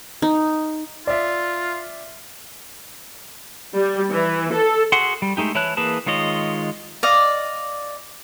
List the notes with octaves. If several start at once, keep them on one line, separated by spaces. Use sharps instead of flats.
D#4
F4 D5 E5
G3
E3
A4
F#4 G#4 F#5 C6
G3
G#3 A3 D#4 G4
E3 E4 C#5 A5 F#6
E3 A#3 G#4 B4 A5
D#3 G#3 F4 C#5 D#5
D5 D#5 F5